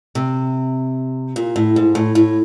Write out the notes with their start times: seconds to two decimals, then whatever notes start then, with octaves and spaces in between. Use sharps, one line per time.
0.15 C3
1.36 A#2
1.56 A2
1.76 G#2
1.95 A2
2.15 A2